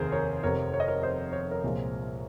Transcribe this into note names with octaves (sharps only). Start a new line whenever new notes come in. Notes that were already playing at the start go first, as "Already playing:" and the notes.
Already playing: F1 D#2 G#4 A#4 C5
A#4 C#5
F1 F2 C3 A#4 C#5
C#5
D#5
A#4 C#5
C5 D#5
C#5
C5
A#4 C#5
C2 A#2 F3 G#3